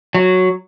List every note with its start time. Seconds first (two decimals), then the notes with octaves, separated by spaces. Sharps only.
0.15 F#3